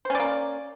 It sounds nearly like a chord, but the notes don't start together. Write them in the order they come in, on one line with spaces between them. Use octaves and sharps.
C5 C#4 D5 A#3